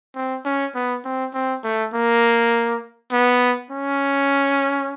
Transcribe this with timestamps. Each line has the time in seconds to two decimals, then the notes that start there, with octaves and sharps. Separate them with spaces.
0.15 C4
0.45 C#4
0.75 B3
1.05 C4
1.34 C4
1.64 A3
1.94 A#3
3.12 B3
3.71 C#4